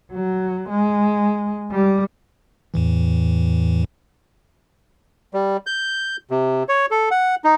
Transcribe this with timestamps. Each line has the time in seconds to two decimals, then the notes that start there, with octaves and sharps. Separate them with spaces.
0.13 F#3
0.70 G#3
1.72 G3
2.74 E2 A2 E3
5.34 G3
5.67 G6
6.31 C3
6.69 C#5
6.91 A4
7.11 F#5
7.44 D#4